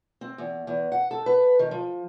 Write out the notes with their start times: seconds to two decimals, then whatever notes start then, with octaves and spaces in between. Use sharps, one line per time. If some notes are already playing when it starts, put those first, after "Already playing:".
0.21 C4
0.38 E2
0.67 E2
0.92 F#5
1.11 A4
1.26 B4
1.59 D#3
1.71 F3